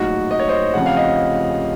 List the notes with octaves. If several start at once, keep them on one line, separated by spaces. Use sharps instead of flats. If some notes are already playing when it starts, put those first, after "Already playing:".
Already playing: A#1 A2 F#3 D#4 F#4
D#5
C#5
C5 D#5
F1 F2 C#3 F3 F#5
F5
D#5